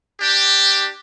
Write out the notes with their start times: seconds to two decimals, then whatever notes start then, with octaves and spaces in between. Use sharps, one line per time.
0.20 D4 G4